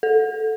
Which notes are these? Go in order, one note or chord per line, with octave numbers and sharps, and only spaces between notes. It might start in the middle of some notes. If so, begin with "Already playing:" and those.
A4